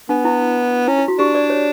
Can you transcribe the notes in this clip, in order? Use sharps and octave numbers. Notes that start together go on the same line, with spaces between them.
B3 D4
E4
C#4 E4
E4
F#4
D4 G4
D5
C#5